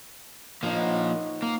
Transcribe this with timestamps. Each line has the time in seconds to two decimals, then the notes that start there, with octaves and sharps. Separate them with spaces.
0.63 F3 A#3 D#4 C#5
0.78 F#5
0.91 A#5 C#6
1.42 A#3